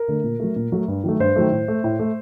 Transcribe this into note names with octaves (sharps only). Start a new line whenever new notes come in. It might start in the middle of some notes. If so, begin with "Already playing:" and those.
Already playing: A#4
D3 A3
A#2
F#3 A3
A#2
F#3 A3
G2
D#3 F#3 A3
G2 C5
D#3 F#3 A3
A2
A3
A2
A3